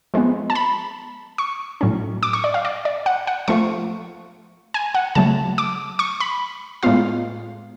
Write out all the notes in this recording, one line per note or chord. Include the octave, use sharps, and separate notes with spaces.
F3 G#3 B3
A5
B5
C#6
A2 F#3 C#4
D6
C#6
D5
F5
D5
D5
F#5
F#5
F3 A3 F4 C#6
G#5
F#5
C#3 F#3 A3 A5
D6
C#6
B5
A2 G#3 B3 F4 F5